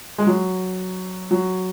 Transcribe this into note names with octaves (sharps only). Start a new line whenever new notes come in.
G#3
F#3
F#3